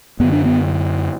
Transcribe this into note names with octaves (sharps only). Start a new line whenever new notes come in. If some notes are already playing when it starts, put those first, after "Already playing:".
F#2 D3 B3
D4
B3